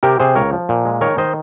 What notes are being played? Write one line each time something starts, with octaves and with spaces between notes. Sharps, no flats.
C3 G4 A#4
C3 G#4 C5
C#2 A#4 C#5
F3
A#2
G#3
D#3 A#4 C#5
D#3 C5 D#5